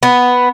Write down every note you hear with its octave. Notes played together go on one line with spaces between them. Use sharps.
B3